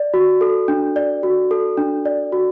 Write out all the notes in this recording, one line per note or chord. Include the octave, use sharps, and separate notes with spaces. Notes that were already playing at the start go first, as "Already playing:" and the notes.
Already playing: D5
F#4
A4
D4
D5
F#4
A4
D4
D5
F#4